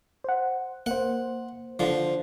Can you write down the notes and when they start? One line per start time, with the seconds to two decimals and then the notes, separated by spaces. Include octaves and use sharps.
0.24 C5 F#5
0.86 A#3 C5 F#5
1.79 D3 F3